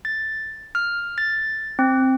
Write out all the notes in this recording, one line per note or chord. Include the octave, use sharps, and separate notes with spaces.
A6
F6
A6
C4